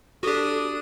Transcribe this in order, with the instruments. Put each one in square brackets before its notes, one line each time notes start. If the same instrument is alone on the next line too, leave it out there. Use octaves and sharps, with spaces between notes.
[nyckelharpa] D4 D#6 [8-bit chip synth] F#4 G4 [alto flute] A4